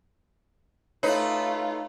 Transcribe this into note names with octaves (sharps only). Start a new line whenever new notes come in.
A3 D#4 F4 B4 C#5